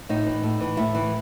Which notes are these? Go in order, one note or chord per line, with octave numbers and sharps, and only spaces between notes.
A2 D#4
E3
A2
E3
A2 E4
E3